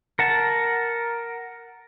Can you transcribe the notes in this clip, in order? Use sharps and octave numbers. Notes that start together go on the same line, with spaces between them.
A#4 F#5 A5